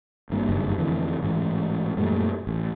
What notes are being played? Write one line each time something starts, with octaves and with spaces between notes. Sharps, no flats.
G#1 G2 A#3
F#1 G2 D#3
F2 D3 E3 A3
A1 G#2 E3
F#2 A#2 G3 A3
A1